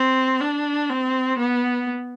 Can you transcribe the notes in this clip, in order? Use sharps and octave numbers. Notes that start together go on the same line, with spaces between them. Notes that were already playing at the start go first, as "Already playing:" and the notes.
Already playing: C4
D4
C4
B3